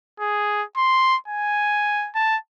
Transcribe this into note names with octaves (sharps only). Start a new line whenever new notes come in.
G#4
C6
G#5
A5